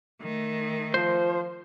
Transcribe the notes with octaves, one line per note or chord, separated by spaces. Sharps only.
D#3 A3
F3 C5